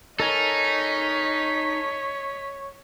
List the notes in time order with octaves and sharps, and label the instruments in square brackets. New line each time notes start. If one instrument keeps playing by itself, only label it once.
[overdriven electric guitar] D#4 [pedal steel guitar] A4 A#4 G#5 [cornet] C#5 [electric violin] D#5 B6